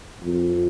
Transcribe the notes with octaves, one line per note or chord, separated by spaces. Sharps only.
F2